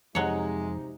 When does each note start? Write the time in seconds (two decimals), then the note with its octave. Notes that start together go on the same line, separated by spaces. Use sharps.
0.15 F2 C3 F#3 G#3 D#4 C#5